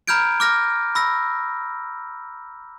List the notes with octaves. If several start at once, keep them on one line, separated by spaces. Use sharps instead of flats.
A#5 B5 F6 G6 G#6 D7
D6 F6 A#6
B5 E6 A#6